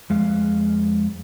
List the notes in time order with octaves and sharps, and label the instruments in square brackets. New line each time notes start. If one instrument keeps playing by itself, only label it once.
[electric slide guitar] F2 G#3 F5